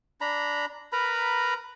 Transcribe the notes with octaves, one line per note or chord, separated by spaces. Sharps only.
D4 A#5 B5
A#4 B4 A#5 B5